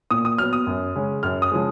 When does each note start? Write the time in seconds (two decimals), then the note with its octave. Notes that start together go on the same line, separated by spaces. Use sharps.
0.11 A#2 D#6
0.25 D#6
0.38 F#3 F6
0.42 B3
0.53 D#6
0.67 F#2
0.96 C#3 G#3 C#4
1.23 F#2 F6
1.42 D#6
1.52 C#3 F3 G#3